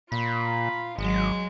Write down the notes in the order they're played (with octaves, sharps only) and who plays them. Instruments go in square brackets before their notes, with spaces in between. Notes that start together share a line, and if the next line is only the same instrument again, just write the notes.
[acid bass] A#2 [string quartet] F4 [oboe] B5
[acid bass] G#1 [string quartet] F#3 G#3